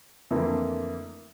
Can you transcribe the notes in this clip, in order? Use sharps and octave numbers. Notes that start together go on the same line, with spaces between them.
F2 D3 E3 A3 A#3